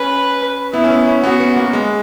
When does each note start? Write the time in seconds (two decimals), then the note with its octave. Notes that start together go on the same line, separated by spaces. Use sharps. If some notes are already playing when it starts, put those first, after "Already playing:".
Already playing: C#4 B4
0.73 B3 E4
0.84 C#4
0.90 B3
1.07 C#4
1.23 B3 F#4
1.40 B3
1.56 A#3
1.73 G#3